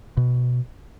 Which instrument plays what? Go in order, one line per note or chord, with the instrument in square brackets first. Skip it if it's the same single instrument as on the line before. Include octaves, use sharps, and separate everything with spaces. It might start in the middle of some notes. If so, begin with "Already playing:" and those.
[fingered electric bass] B2